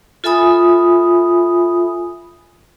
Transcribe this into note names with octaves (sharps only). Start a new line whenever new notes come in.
F4 A4 E5 G#5 B5 D#6